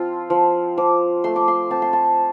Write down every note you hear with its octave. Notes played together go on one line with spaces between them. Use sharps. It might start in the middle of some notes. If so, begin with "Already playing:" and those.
Already playing: F3 C4 F4 A5
F3
F3 D6
A3 C6
D6
C6
C4 A5
C6
A5